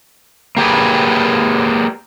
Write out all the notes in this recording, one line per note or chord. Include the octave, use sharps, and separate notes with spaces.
A#3 G4 G#4 B4